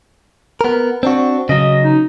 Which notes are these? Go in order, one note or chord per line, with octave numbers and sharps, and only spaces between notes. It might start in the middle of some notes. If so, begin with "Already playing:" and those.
B3 A#4
C4 D4 F#4
C#3 F#3 D#5
D#4